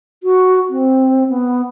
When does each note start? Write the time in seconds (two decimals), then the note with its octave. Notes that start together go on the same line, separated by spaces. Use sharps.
0.23 F#4
0.70 C4
1.29 B3